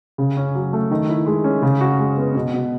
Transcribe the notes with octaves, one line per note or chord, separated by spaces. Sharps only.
C#3
C#4
F#3
A3
D#3
E4
G#3
C#4
C#3
F#4
G#3
B3
B2
B2